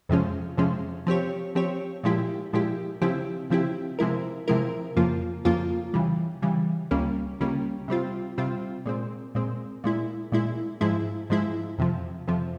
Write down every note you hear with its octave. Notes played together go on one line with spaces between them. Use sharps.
F2 C3 F3 G#3 C#4
F2 C3 F3 G#3 C#4
F3 C4 G4 C#5
F3 C4 G4 C#5
A#2 F3 G#3 E4 G4
A#2 F3 G#3 E4 G4
C#3 F3 C4 E4 G4
C#3 F3 C4 E4 G4
C3 F3 G#3 E4 A#4
C3 F3 G#3 E4 A#4
F2 C#3 F3 A#3 F4
F2 C#3 F3 A#3 F4
C#3 E3 G3
C#3 E3 G3
C#2 C#3 G3 A#3 C#4
C#2 C#3 G3 A#3 C#4
C3 G3 C4 F4
C3 G3 C4 F4
A#2 G#3 C4
A#2 G#3 C4
A#2 G#3 E4
A#2 G#3 E4
G#2 F3 G#3 E4
G#2 F3 G#3 E4
F2 C3 F3
F2 C3 F3